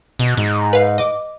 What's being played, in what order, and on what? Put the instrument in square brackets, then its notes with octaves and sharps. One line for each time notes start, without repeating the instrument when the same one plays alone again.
[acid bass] B2
G#2
[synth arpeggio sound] B4 F5 C7
D#5 D6